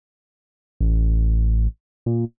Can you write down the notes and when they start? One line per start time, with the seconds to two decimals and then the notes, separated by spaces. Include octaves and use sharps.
0.80 A1
2.06 A#2